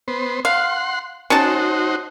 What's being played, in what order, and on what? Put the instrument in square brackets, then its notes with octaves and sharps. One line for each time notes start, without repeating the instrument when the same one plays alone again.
[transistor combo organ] B3 C5
[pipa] F5 [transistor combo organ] F#5 C6
[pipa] C#4 A5 [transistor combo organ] D#4 F#4 C5